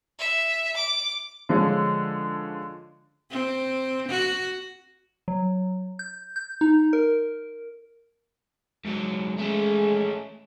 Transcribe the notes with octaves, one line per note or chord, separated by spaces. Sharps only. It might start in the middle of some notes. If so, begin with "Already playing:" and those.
E5
D6
D3 F3 G#3 C#4
C4
F#4
F#3
G6
G6
D#4
A#4
G#2 F#3
G#3 A3 C#4